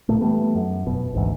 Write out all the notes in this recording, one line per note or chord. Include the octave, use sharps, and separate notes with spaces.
D1 B1 A#2 A3
E3 G3 A3 B3
F#2
F1 B2
G#1 D2 G#2 E3